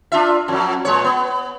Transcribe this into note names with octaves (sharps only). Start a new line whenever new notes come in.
D4 F4 E5
F2 F#3
A#2 G#3 C#5
B3